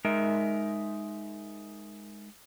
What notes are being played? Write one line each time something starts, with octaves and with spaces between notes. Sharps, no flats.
G#3 D#4 A#4 E5